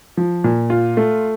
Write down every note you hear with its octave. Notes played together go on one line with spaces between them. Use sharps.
F3
A#2
F4
A3